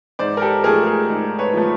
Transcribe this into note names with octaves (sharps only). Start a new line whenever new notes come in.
G#2 C5 D5
A#4
G4 A4
F3 A3 G#4 A#4
G#4 A#4
G#2
B4 C#5
F3 A3